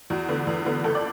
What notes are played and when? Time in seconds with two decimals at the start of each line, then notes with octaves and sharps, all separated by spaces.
0.10 E2 F#4
0.28 D3 B3
0.47 E2
0.66 D3 B3
0.84 F#1 A4
0.95 D5